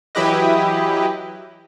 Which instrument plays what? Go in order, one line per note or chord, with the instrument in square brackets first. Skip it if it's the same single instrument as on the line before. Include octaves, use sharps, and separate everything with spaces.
[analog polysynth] E3 F#3 E4 G4 B4 D#5